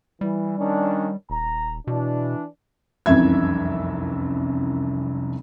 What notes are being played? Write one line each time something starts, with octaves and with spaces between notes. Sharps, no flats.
E3 G3
D#3 C#4 D4
D#1 A#5
B2 E3 D4
F1 C2 F#2 E3 E5 G#6